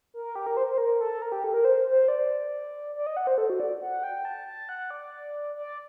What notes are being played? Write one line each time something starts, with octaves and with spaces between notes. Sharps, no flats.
A#4
G4
A#4
C5
C5
A#4
A4
A#4
G4
A4
A#4
C5
C5
D5
D5
D#5
F#5
C5
A4
F#4
D5
F#5
G5
A5
A5
F#5
D5
D5